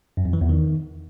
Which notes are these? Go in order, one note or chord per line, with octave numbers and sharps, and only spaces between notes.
F#2
F2
E3
E2
D#3